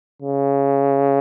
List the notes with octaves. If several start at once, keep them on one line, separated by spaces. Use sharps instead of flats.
C#3